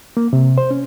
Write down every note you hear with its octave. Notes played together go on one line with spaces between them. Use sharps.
A#3
C3
C5
C#4